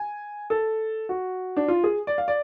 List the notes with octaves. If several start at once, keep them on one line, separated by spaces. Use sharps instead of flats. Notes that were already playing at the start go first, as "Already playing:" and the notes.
Already playing: G#5
A4
F#4
D4
F4
G#4
D5
F5
D5